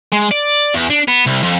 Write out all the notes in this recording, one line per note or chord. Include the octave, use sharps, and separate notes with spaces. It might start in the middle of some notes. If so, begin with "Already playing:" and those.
G#3
D5
E2
D4
B3
C2
F2